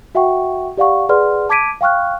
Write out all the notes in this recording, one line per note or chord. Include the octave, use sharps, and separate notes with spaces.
F#4 E5 F#5 G5 C#6
G4 D5 F5 F#5 C#6
G#4 B4 D5 F#5 C6 F6
A5 D6 G#6 B6 D7 D#7
F5 G5 C#6 F6 F#6